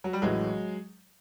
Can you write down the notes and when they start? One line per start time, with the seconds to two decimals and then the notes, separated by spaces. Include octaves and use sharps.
0.04 F#3
0.13 G3
0.22 A1 A2 E3 F#3 G#3